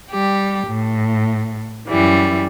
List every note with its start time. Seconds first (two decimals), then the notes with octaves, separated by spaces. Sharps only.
0.10 G3 G4
0.68 A2
1.87 F#2 E3 G3